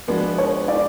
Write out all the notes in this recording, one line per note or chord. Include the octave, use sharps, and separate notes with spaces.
F3 G#3 B3 D4 F#4
C#5
D5